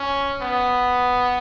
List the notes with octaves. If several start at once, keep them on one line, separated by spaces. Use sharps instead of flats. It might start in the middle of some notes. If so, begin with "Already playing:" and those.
Already playing: C#4
B3